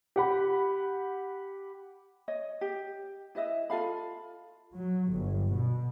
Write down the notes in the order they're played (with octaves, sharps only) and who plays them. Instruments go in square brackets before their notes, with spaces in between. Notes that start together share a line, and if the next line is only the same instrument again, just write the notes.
[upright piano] G4 F#5 B5
[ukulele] C#5 D#5
G4
E4 B4 D#5 E5
F4 A4 F5 B5
[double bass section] F#3
G1
B2